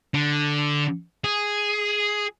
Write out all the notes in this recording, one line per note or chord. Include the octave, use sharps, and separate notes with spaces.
D3
G#4